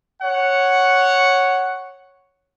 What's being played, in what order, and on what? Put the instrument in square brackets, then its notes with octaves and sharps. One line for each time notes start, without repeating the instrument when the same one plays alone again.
[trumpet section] C#5 F#5